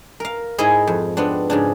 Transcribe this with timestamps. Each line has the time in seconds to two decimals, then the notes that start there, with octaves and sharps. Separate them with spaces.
0.20 A#4 F5
0.58 G#2 E4 G#4 D#5
0.87 F2
1.17 B3 C4 D4
1.50 G#2 C#3 D4